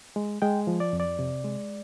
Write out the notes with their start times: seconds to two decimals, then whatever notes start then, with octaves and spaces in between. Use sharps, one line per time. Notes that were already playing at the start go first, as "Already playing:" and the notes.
0.16 G#3
0.42 G#3 G5
0.67 F3
0.80 D5
0.93 F2
1.00 D5
1.19 C3
1.44 G#3